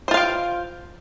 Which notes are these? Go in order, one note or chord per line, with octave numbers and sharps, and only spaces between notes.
F4 C5 F5 G5